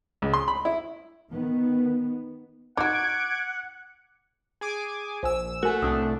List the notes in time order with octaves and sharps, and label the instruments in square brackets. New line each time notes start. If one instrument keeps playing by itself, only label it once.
[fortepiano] C#2
C6
B5
E4
[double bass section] D#3 B3
[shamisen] D#4 F#4 [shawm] F#5 [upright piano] D6 [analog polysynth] G#6 D7
[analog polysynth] G#4 G#5 D6
[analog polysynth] A#1 E6 [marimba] C5 G#5
[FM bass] A3 [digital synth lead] F#4 [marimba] A#4 G#5
[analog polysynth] C2 A2 D4 [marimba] D#6 E6